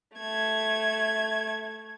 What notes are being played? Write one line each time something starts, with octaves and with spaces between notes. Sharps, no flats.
A3 G#6